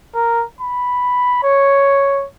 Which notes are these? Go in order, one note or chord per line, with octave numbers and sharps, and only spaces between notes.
A#4
B5
C#5